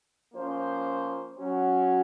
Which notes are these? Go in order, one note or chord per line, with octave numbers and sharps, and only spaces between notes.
F3 A#3 C#4 F4 C5
F#3 C#4 F#4